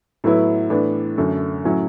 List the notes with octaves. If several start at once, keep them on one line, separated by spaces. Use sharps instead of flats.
A2 F#3 B3 E4
A2 E3 B3 D4
F#2 D3 A3
A2 F#3 C#4 E4